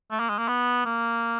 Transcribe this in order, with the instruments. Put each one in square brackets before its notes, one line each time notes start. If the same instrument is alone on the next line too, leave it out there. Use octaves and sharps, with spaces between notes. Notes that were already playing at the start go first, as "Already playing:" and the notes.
[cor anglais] A3
A#3
G#3
A#3
B3
A#3